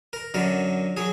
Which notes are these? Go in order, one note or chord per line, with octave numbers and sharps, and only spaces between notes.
A#4
F#2 D3 F#3 A#4
F#3 G#4